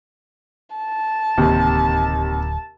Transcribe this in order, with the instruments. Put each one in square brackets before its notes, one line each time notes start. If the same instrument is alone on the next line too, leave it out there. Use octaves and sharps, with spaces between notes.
[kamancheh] A5
[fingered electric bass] D1 [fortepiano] D#2 C3